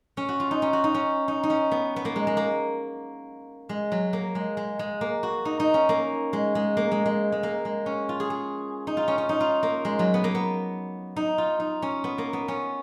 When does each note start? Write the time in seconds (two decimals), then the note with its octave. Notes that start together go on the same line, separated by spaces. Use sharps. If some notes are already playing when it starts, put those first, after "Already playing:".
0.17 C#4
0.29 F#4
0.40 F4
0.51 D#4
0.62 C#4
0.73 F#4
0.84 D#4
0.94 C#4
1.28 D#4
1.43 D#4
1.50 C#4
1.71 B3
1.96 B3
2.05 A#3
2.16 G#3
2.27 G#3
2.37 A#3
3.69 G#3
3.92 F#3
4.13 A#3
4.35 G#3
4.57 G#3
4.79 G#3
5.01 A#3
5.23 F#4
5.45 D#4
5.60 D#4
5.74 C#4
5.89 A#3
6.33 G#3
6.55 G#3
6.77 A#3
6.92 G#3
7.06 G#3
7.32 G#3
7.43 A#3
7.65 G#3
7.86 C#4
8.09 F4
8.20 G#4
8.30 G#4
8.87 D#4
8.97 F4
9.08 C#4
9.18 C#4
9.29 D#4
9.40 F4
9.63 A#3
9.85 G#3
9.99 F#3
10.14 B3
10.24 A#3
10.35 B3
11.16 D#4
11.38 F4
11.60 D#4
11.82 C#4
12.04 B3
12.18 A#3
12.33 B3
12.48 C#4